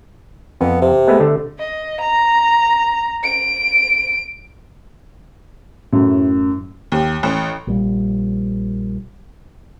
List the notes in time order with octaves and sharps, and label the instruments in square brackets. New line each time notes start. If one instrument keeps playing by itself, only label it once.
[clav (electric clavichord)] F2 [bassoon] B3
[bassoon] C3
[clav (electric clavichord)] G#3 A3 B3
D3 A3
[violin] D#5
A#5
D7
[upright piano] F#2 [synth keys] A2
[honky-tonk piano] D#2
A1
[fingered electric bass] A#1 G3